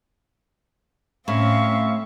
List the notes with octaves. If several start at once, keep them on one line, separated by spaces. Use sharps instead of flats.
A2 C4 C#4 E5 F5 C#6